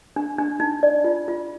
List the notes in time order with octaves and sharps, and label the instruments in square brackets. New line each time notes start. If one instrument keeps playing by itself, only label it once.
[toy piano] D4
D4
D#4
D5
F4
F4